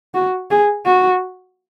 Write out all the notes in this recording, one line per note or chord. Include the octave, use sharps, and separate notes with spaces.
F#4
G#4
F#4